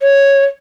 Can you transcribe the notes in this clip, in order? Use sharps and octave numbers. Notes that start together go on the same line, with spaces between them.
C#5